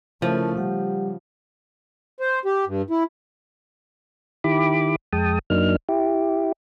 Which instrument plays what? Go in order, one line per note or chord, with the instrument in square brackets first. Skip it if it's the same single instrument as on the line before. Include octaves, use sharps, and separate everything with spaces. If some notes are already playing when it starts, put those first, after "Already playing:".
[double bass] C#3 A3 [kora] F3 [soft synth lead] E4 [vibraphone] A#4 F5 A5
[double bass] C#3 [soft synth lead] G3 [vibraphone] G4 F#5
[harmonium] C5
G4
G2
E4
[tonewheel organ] D#3 E4 G4 B5 D6
F2 G#3 G5 A5 D#6
F#2 F#3 A#3 D4 D#4 F6
E4 G4